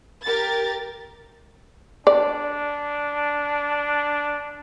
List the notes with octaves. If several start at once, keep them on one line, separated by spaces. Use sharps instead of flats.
G4 A#4 A6
D4 D5